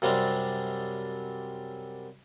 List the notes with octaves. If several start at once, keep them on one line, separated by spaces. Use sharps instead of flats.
F#2 C3 G3 C4 D4